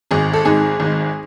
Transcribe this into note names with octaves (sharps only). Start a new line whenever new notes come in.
G#1 G#2 D#3 G#3 G#4
A4
G#1 G#2 D#3 G#3 G#4
G#1 G#2 D#3 G#3